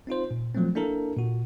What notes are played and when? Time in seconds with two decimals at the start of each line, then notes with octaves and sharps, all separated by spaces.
0.07 C4 D#4 F4 C5
0.31 A#2
0.55 F3 F#3 A3 A#3 C4
0.75 A#3 D4 E4 A4 A#4
1.16 A#2 F#4